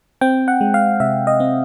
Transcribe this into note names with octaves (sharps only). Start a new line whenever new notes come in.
C4 G5
F#5
G#3
F5
C3 E5
D#5
C4